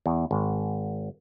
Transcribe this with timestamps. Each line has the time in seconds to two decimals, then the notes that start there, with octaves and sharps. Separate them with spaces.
0.06 E2
0.31 G#1